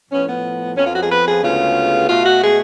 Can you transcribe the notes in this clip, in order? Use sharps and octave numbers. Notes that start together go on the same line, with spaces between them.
A2 F3 B3 C#4
B3
F2 F3 B3 C#4
F4
F#4
G#4
B4
G#4
D2 C#3 G#3 B3 F4
B2 A3 F4
F#4
G#4